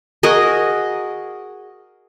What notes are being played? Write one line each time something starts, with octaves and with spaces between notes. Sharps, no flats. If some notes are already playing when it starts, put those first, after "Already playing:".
F#4 G#4 A#4 D#5